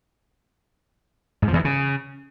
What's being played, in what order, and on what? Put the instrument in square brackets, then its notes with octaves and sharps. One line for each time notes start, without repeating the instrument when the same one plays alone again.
[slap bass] G#2
F3
E2
E3
C#3